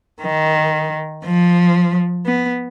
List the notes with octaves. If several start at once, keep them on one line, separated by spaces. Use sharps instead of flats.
D#3
F3
B3